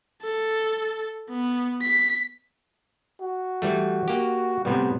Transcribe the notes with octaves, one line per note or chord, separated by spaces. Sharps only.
A4
B3
B6
F#4
E3 G3 A3
A#3 G4
A2 C3 G3 B3